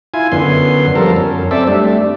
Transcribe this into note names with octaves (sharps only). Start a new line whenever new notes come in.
E4 F4 G#5
F#2 D3 B3 C6
F3 G3 A4 A#4
F#2
C4 A4 D5 E5
G3 A3 D4